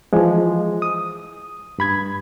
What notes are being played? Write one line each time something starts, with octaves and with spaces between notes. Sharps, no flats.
E3 F3 G#3
D#6
G2 B5 G#6